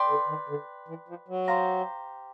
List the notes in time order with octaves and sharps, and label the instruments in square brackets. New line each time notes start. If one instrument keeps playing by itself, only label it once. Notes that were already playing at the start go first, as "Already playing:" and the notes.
Already playing: [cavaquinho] B4 D5 G5 C6
[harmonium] D3
D#3
D3
E3
F3
F#3
[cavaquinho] G4 C5 F5 A#5